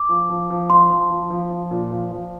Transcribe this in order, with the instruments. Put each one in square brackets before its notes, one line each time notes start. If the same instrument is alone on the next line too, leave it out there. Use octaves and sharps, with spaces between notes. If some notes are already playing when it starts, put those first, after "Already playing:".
Already playing: [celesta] D6
[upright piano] F3
F3
F3
[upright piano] F3 [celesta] C6
[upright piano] F3
F3
F3
F3
A#2
F3
F3